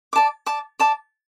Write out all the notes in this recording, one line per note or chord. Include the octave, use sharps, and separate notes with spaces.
D5 A5 D6
D5 A5 D6
D5 A5 D6